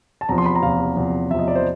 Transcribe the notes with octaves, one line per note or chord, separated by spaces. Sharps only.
A5
E2 C3 F3 A#5
C6
B5
A#5
E2 C3 F3 F5
E2 C3 F3
E2 C3 F3 E5
D#5
D5
C5